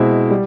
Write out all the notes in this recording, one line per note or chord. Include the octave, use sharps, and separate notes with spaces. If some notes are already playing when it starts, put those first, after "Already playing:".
Already playing: B2 G#3 C4 E4
G3